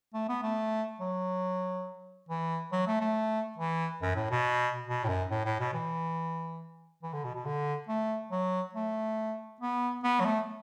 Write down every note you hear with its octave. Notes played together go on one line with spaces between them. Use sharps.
A3
B3
A3
F#3
E3
F#3
A3
A3
E3
F#2
A2
B2
B2
A2
F#2
A2
A2
B2
E3
E3
D3
B2
B2
D3
A3
F#3
A3
B3
B3
F#3
A3